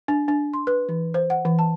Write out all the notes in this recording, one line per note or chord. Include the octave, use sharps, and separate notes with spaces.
D4
D4
C6
B4
E3
C5
F#5
E3
A5